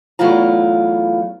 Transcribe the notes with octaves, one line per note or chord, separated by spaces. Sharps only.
E2 F#3 A3 E4 F4 A#5